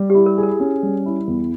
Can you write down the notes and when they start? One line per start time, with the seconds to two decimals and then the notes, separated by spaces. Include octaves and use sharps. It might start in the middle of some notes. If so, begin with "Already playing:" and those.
Already playing: G3
0.10 E4 G4
0.26 A#4
0.38 G#4
0.43 A#4
0.60 C#4
0.83 G3
1.06 E4
1.27 E2